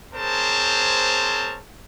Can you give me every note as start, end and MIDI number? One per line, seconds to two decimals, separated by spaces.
0.14 1.59 60
0.14 1.59 68
0.14 1.59 70
0.14 1.59 72
0.14 1.59 73
0.14 1.59 81